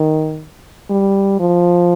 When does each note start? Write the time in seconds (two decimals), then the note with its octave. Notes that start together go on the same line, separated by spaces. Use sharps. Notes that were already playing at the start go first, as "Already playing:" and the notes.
Already playing: D#3
0.90 G3
1.40 F3